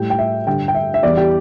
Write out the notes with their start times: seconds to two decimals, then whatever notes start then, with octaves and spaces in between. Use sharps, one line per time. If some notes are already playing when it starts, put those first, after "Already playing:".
Already playing: A2 G3 G5
0.10 G5
0.19 E5
0.47 G2 D3 G3 G5
0.68 G5
0.75 E5
0.94 E5
1.03 E2 E3 G3 D5
1.17 G4